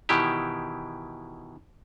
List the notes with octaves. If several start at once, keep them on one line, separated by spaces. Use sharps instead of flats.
B2 D#3 E3 E4 G4